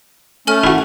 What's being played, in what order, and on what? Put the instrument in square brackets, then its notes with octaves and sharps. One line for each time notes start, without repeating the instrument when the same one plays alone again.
[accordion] A3 C#4 [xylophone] A4 G#5 F6
[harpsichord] E4 F#4